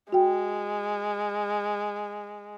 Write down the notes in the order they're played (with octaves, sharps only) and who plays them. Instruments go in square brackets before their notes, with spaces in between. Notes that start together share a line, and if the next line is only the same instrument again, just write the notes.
[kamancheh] G#3 [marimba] F#4 G5